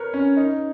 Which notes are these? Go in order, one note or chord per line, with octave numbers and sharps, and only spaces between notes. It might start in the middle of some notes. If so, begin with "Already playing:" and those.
Already playing: A#4 B4 C#5
C#4
D#4